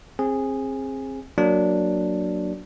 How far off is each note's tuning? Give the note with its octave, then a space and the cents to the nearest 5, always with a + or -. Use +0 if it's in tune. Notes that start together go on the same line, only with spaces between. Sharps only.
C4 +25 G#4 -10
F#3 +0 A#3 -5 D4 +0